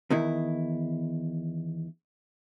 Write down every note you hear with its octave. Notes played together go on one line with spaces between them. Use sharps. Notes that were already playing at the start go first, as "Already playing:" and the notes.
E2 D#3 E4